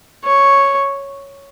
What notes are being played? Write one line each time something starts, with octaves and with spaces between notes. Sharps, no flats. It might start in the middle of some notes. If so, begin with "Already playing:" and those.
C#5